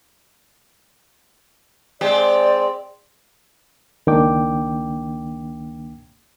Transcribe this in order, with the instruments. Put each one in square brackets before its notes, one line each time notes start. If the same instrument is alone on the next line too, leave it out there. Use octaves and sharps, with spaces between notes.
[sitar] G#3 C4 G4 [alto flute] D5
[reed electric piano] C#2 D#3 A#3 D4 G5 D6